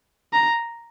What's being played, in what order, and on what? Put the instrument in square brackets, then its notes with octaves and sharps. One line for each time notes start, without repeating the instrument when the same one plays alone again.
[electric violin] A#5